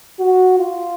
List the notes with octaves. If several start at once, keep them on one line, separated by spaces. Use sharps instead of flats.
F#4
F4